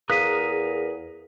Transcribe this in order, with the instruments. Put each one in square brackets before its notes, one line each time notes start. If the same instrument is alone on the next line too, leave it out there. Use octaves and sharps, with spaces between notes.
[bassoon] E2 [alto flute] G#4 [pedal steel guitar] A#4 D#6 F#6 [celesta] F5 B6 D#7